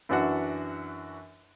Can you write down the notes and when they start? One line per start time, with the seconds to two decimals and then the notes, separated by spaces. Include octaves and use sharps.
0.09 F#2 E3 D4 F#4 F#5